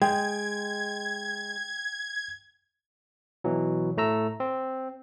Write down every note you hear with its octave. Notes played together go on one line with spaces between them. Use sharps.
G#3 G5 G#6
B2 E3 F#3
A2 A3 A#5 E6
C4